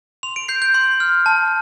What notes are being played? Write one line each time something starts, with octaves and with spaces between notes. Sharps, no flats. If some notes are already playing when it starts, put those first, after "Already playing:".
C6 F7
D7
G6 C7
G6
C6
F6
A5